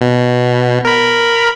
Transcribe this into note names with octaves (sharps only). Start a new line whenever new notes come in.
B2
A#4 B5